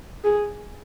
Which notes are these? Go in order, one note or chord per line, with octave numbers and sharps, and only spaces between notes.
G#4